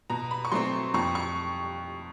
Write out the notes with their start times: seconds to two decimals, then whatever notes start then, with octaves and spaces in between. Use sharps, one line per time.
0.10 B2 A#5
0.31 B5
0.45 C#6
0.52 F#3 A3 C4 C6
0.94 F2 C#6
1.15 C#6